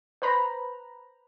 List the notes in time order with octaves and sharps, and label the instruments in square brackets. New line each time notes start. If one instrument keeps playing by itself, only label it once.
[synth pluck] B4 C5 A#5 B5